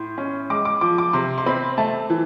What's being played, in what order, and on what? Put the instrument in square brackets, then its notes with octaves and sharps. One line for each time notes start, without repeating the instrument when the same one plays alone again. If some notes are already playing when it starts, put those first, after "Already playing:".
Already playing: [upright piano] A2 C6
C#4
G#3 D6
D6
F3 D6
D6
C3 C6
C6
C4 B5
A3 A5
E3